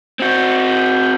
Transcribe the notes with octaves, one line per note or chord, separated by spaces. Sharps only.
C4 F#4